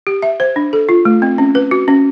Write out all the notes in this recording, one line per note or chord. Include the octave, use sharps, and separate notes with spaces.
G4
E5
C5
D4
A4
F4
A3
C4
C#4
B4
F#4
C#4